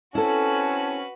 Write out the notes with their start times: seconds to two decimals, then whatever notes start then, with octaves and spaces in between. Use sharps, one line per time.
0.15 C4 C#4 E4 F#4 A4 B4 A5